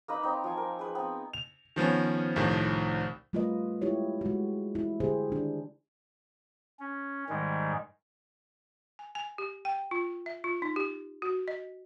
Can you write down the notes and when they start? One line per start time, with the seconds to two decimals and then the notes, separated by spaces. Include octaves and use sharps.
0.08 A#3 D#4 B4 B5
0.23 C4 D#4
0.44 F3 G#5
0.57 A#4
0.79 G#4 B4
0.95 B3 C4
1.33 F7
1.76 D#3 F3 B3 C#4
2.36 C2 A2 D#3 F3
3.33 G3 A3 F4 A#4 B4 D#5
3.81 G#3 E4 F4 G4 C#5
4.21 G#3 F#4
4.75 E4
5.00 D3 G4 G#4 C5
5.30 D#3 D4
6.80 C#4
7.29 G#2 D#3 G3 G#3
8.99 G#5
9.15 G#5
9.38 G4
9.65 G5
9.91 F4
10.26 E5
10.44 F4
10.62 D#4
10.76 G4
11.22 F#4
11.48 D#5